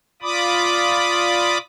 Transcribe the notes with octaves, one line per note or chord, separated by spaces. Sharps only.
F4 D5 B5 D6 D#6